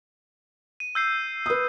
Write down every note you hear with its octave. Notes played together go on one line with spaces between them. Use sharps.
D#7
E6 G6 C7
B4 D#6